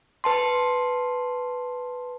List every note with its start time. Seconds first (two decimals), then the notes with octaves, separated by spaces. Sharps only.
0.24 B4 A5 C6